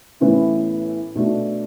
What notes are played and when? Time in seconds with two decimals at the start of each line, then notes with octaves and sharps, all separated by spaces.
0.20 A1 A2 E3 B3 E4
1.15 B2 A3 D4 F#4